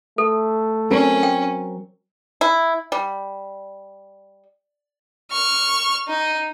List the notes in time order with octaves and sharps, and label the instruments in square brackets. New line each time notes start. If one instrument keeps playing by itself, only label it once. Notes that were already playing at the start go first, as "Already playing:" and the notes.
[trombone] A3 [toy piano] A4
[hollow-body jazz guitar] F#3 C4 A#4 [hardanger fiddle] C#4
[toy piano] G5
[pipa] E4
G3
[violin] C#6 F6
D#4